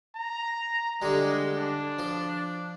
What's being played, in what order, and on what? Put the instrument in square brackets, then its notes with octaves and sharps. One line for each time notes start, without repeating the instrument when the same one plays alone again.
[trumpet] A#5
[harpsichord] D3 G3 [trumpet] G#3
[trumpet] D4
[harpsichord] F3